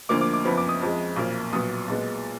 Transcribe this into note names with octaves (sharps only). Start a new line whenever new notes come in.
D2 D3 F3 A#3 D6
D6
D6
F#1 F2 F3 B3 B5
D6
D#6
F2 F3 G#3
B1 A#2 F3 A#3
B1 A#2 F#3 B3 D#6
B1 A#2 G#3 B3